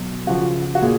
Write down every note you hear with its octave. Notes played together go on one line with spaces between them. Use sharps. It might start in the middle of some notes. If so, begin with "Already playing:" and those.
Already playing: B2 F#3
C#3 F3 F#4
F#4
A#2 G#4